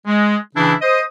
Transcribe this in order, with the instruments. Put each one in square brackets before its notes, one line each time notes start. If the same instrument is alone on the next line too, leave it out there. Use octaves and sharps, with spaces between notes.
[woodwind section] G#3
C#3 E3 C#4 D4 E4
C5 D#5 D#6